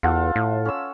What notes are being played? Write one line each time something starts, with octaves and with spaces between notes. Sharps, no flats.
E2 F4 A4 F#5
A2
C#4 E6